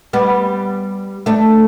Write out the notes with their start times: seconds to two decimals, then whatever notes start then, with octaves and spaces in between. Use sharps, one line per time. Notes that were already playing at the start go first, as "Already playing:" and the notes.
0.13 G3 B3
1.26 A3 D4